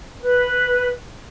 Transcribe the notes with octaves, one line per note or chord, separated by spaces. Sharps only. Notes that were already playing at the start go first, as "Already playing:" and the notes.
B4